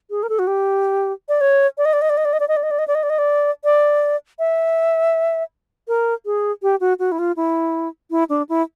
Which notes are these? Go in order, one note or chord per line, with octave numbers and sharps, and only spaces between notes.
G#4
A#4
A4
F#4
G4
D5
C#5
D5
D#5
D5
D#5
D5
D#5
D5
D#5
D5
D#5
D5
D#5
D5
D#5
D5
D#5
D5
D#5
D5
D5
E5
A#4
G#4
G4
F#4
F#4
E4
F4
E4
E4
D4
E4